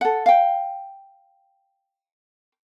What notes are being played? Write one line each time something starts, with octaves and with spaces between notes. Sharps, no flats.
A4 F#5
F5 G5